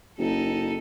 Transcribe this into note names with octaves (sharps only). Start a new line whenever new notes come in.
F#1 D#4 A4